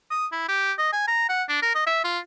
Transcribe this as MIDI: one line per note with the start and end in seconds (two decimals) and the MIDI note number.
0.10 0.27 87
0.32 0.45 64
0.49 0.73 67
0.78 0.89 75
0.93 1.03 80
1.08 1.28 82
1.29 1.43 78
1.49 1.60 62
1.62 1.73 70
1.75 1.83 75
1.87 2.00 76
2.04 2.19 65